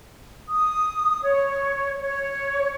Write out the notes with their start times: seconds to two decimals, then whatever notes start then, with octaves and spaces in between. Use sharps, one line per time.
0.49 D#6
1.24 C#5
2.01 C#5